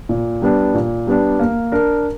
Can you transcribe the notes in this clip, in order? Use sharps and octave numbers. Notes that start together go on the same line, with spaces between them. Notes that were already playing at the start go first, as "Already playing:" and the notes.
A#2
G3 B3 D4
A#2
G3 B3 D4
A#3
D4 A#4